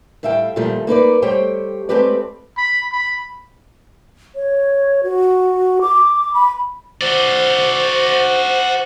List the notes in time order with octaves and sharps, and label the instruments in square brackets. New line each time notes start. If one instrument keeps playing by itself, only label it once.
[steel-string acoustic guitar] A2 G3 E5 F5 G5
A#2 D#3 F3 G3 A3
A#3 D#4 B4 D5
G3 A3 G4 C5 C#5 G5
G#3 A3 C4 G4 B4 D5
[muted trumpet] B5
B5
[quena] C#5
F#4
D6
B5
[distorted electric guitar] F#4 D5 [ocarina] C5